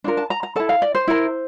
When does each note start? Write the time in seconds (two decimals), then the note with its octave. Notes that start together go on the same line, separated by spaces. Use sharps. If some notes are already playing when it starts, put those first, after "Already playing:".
0.04 D4 F4 A#4
0.17 A5
0.30 A#5
0.43 A#5
0.56 E4 A4 A5
0.69 F5
0.82 D5
0.95 C5
1.08 E4 A#4